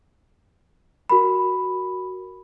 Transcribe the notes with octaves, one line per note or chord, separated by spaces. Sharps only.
F#4 A#4 B5